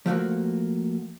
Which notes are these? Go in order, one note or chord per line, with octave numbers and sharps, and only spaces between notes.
F3 A3 A#3 F#4